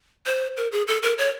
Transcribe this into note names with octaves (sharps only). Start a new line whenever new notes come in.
C5
A#4
G#4
A4
A#4
C#5